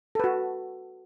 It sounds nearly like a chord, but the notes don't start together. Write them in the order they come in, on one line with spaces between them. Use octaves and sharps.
A4 B4 F#4